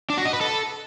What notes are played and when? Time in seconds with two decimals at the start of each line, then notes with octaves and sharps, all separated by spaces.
0.10 D4
0.18 F#4
0.25 D#5
0.33 B4
0.41 A4